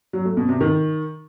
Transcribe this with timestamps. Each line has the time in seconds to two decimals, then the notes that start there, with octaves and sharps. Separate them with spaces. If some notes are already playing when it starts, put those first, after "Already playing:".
0.13 F#3
0.25 A3
0.37 B2
0.49 C3
0.61 D#3